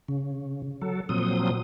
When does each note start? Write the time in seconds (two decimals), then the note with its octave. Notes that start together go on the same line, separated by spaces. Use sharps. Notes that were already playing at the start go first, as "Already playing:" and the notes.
0.08 C#3
0.82 F#3 A4
1.09 A#2 F3 F#3 C4 D#6